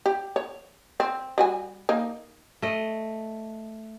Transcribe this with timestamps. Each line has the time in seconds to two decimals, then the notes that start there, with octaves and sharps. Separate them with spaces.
0.06 G4
0.36 C#5
1.00 C4
1.38 G3 F#4 G#5
1.89 A#3 D#4
2.62 A3 D#5